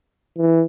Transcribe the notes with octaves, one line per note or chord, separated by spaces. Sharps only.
E3